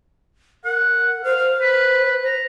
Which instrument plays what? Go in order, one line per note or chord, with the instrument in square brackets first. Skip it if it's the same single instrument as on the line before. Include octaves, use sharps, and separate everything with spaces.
[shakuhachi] A#4 [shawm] F#5
[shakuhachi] C5 [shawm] F5
[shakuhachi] C5
[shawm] B4
A#5